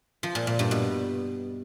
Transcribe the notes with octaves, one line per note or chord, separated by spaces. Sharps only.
F3
A#2
A#2
G2
B2